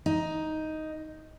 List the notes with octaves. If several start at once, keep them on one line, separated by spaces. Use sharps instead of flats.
D#4